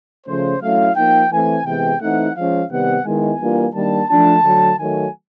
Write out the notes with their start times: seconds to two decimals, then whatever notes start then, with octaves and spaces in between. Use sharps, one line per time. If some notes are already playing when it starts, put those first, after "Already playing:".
0.26 C#3 F3 A3 C#4 C5
0.61 F#3 A3 C#4 E4 F5
0.96 F3 A#3 D#4 G5
1.32 E3 A3 C4 G#5
1.65 C3 E3 G#3 B3 G5
2.01 E3 A3 C4 D#4 F#5
2.36 F3 G#3 C#4 F5
2.71 C3 D#3 G3 B3 F#5
3.05 D#3 G#3 B3 E4 G#5
3.40 E3 G3 A#3 D4 F4
3.74 D#3 G3 A#3 D4 A5
4.09 F3 A3 D4 F4 A5
4.43 D3 F#3 A3
4.78 D#3 F#3 A3 G#5